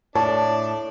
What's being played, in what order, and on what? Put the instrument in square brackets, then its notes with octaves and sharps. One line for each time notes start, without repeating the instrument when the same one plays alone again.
[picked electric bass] A2 [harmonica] D4 D5 [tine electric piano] C#5 [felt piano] A5